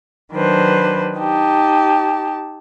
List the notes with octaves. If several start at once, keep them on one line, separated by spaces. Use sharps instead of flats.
D#3 F#3 D4 B4 C5
D#4 G4 A5